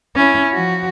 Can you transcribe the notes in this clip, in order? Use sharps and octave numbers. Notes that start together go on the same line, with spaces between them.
C#4 E4
F3 F#4